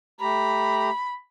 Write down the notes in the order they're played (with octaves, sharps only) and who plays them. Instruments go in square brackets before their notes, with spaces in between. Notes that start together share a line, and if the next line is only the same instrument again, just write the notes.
[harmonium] A3 G4 A#5 [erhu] B5